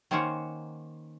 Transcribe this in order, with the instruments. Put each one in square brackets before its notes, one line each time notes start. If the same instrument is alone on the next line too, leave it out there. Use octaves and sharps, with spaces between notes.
[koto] D#3 A#3 C#4 C5 C#5 F#5